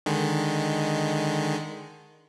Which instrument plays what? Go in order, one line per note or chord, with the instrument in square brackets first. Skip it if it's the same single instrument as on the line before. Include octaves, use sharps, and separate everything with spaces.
[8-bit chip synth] D3 D#3 G#3